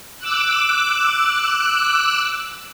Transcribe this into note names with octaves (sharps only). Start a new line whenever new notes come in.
D6 E6 F#6